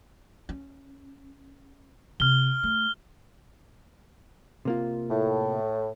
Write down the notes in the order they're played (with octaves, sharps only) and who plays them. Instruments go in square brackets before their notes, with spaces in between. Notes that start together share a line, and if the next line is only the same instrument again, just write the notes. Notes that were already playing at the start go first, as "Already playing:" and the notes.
[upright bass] C#4
[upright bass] C3 [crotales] F6 G7
[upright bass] A3
[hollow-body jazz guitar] C3 A#3 F4
[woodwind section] A2